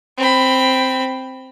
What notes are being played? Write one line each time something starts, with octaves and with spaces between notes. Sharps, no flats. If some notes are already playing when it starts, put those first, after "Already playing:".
C4 B5